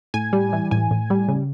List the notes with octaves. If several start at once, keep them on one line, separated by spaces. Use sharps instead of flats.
A2 G#5
G3
E3
A2 G#5
A2
G3
C#3